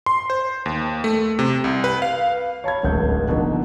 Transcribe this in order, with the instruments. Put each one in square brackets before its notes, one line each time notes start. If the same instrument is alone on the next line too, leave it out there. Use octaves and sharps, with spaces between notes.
[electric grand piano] C6
C5
D#2
A3
C3
C2
B4
F5
[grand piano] C#5 A5 B5 G#6
D1 G#1 C#2 F#3 A3 G6
B2 D3 D#3 F3 A#3